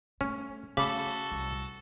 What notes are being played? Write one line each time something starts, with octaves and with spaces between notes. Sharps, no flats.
A3 C#4
C#3 A3 F#4 A4 B5 D6 B6
C2